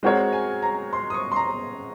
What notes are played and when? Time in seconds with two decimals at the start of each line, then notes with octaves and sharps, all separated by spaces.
0.03 G#3 C4 F#4 A#4 C#5 D#5
0.33 G#5
0.62 A#5
0.93 C6
1.10 D#6
1.14 C#6
1.32 C6
1.36 A#5